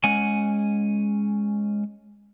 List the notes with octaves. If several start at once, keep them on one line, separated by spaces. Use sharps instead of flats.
G#3 C#4 F#5 G#5